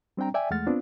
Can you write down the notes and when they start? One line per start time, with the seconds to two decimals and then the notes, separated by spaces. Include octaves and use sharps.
0.17 G3 C4 D4 G5 A#5
0.34 D5 E5 G5 G#5
0.50 E2 G#3 A3 F#5 F6 A6
0.67 B3 C4 D4 F4